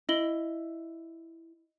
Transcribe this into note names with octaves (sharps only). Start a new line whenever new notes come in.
E4 D#5 F#7 G7